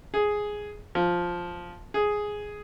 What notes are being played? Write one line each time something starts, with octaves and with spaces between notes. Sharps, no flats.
G#4
F3
G#4